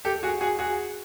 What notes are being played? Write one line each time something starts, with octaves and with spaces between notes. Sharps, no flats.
G4 A4
F#4 G#4
F#4 G#4
F#4 G#4